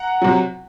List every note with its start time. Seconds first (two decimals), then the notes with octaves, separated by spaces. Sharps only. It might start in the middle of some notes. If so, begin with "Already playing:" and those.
Already playing: F#5 A#5
0.22 C3 F#3